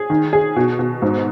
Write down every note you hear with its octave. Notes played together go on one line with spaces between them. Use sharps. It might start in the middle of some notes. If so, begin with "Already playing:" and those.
Already playing: G#4
D#3
G#4
B2
B2
G#2